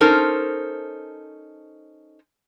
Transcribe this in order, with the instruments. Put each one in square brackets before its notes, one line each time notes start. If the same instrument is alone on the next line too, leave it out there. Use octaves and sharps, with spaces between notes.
[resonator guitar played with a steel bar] C#4 D#4 A4 A#4 C5